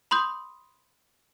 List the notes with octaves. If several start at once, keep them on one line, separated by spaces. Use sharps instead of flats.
B5 C6 D#6 G6